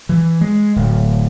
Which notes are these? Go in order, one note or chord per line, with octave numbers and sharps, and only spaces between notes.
E3
G#3
D1